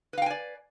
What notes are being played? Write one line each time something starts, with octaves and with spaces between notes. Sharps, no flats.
B4 D5 F5 G5 G#5